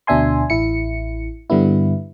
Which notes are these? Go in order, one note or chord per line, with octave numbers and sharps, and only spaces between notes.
D2 B2 D4 E5 G#5 C6
A1 E4 C#7
G2 D3 G3 B3 E4